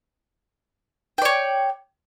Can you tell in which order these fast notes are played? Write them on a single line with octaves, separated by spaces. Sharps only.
G5 D5 C#5